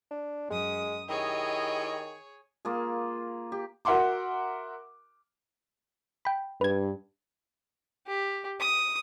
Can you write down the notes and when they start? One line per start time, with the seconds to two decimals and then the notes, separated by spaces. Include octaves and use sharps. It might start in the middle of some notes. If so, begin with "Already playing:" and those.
0.11 D4
0.50 F#2 G#3 D#6
1.09 D#3 E4 G4 G#4 C#5 D#5
2.65 A#3 F4 G#4
3.52 G4
3.85 F#4 A#4 E5 F#5 C6 D6
6.25 G5 B5
6.61 G2 B4 G#6
8.06 G4
8.60 D#6